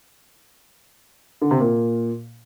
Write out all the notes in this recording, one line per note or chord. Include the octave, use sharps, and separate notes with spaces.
D3
C3
A#2